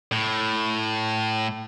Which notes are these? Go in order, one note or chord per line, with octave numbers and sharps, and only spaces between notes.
A2